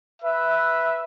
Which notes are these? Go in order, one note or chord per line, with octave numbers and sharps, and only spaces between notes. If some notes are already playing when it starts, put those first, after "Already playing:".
B4 E5